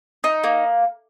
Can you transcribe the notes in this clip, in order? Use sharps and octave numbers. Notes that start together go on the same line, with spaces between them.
D#4
A#3